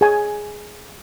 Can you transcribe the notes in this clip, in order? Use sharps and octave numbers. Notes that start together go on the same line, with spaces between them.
G#4 G#5